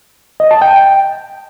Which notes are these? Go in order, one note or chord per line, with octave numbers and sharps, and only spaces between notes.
D#5
A5
G5